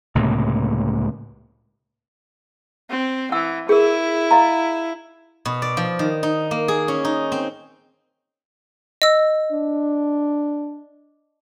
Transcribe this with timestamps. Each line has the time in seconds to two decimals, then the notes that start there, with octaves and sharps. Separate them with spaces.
0.15 C#2 A2 C3 A#3
2.90 C4
3.32 E3 F#5 E6
3.69 E4 G#4 A#4
4.31 D#5 F5 A#5
5.45 B2
5.62 D5
5.77 F3
5.99 D#3
6.23 D#4
6.51 A#3
6.68 G#4
6.88 C#4
7.05 D#4
7.32 C4
9.02 D#5 E6
9.52 D4